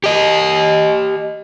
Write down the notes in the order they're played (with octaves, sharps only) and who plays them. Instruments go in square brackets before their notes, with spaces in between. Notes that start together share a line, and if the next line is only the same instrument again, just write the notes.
[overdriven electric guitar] G4 D#5